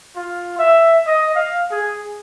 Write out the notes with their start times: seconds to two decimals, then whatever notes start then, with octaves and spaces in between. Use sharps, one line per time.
0.16 F4
0.59 E5
1.07 D#5
1.35 F5
1.72 G#4